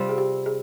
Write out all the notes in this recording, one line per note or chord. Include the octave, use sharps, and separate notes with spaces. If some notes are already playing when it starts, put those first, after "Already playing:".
Already playing: C3 G3 C4 F4
G#4
G4
G#4